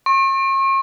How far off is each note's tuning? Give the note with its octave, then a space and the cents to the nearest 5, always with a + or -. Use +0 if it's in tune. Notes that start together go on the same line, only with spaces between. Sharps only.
C#6 -40